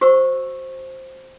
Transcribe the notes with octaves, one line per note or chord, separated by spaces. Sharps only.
F#4 C5 C#6 E6